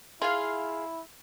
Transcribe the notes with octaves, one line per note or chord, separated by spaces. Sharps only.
E4 F4 G#4 F5